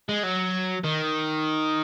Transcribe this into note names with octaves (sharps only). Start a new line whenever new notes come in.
G#3
F#3
D#3